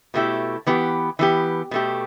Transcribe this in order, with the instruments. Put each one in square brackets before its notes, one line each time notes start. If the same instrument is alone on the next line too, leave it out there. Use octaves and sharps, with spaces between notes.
[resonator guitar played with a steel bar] B2 A3 E4 G4
E3 B3 G4
E3 B3 G4
B2 A3 G4